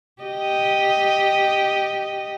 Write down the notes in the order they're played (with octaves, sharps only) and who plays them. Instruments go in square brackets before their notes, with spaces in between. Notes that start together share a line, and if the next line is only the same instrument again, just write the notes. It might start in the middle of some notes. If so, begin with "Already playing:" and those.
[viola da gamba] G4 D#5